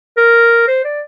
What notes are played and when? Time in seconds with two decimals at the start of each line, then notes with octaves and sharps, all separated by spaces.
0.17 A#4
0.68 C5
0.84 D5